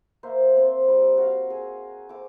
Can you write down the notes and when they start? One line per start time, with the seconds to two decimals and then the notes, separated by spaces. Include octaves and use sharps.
0.23 A#3 C5 C#5 E5
0.57 C4
0.88 G3
1.18 F#4 F5
1.50 G#4
2.09 D6 E6